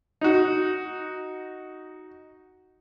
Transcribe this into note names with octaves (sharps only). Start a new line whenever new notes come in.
D#4 F#4